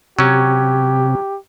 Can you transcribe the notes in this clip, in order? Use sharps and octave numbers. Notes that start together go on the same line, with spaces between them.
C3 F#3 C#4 G4